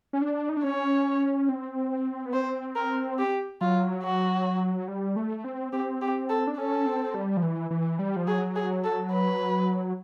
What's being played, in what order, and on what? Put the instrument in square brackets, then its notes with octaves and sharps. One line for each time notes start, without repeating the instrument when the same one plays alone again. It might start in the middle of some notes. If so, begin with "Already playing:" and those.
[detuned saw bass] C#4
D4
D#4
D4
[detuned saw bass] C#4 [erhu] C#5
[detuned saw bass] C4
B3
[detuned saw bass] C4 [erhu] C5
[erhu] A#4
G4
[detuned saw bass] F#3 [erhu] F4
[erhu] F#4
[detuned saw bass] G3
A3
C4
[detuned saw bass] C4 [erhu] G4
[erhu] G4
A4
[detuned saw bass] D4
[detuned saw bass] C#4 [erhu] A4
[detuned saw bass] C4
G3
F3
E3
E3
G3
F3
[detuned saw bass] F#3 [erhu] G#4
[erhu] G#4
A4
B4